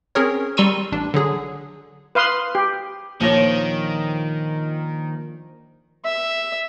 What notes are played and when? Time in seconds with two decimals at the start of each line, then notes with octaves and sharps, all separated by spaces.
0.15 C4 C#4 G#4 A#4 C#5
0.57 G3 A#5 C6 C#6 E6 D#7
0.92 A1 D4
1.14 D3 F#3 G#4
2.15 B4 F5 C6 D#6
2.55 G4
3.20 A#1 D#3 F3 A#3 F4 C#5 A#6
6.04 E5